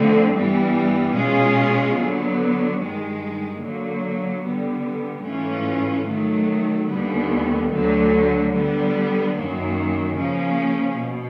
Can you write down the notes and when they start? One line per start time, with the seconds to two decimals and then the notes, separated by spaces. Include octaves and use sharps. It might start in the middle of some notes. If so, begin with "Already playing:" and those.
Already playing: D3 F3 A3 C4
0.33 G2 E3 G3 B3
1.15 B2 G#3 C#4 F4 G#4
1.97 D3 F#3 B3
2.80 G2 D#3 G#3
3.62 D3 F#3 A#3
4.44 D3 G3 B3
5.25 G#2 E3 A3 C#4 F4
6.08 D#3 F#3 A3
6.90 D#2 D3 G3 B3
7.71 D2 D3 F#3
8.54 D3 G3 B3
9.36 F#2 D#3 F#3 A#3
10.18 C#3 F3 A#3 C#4
11.00 B2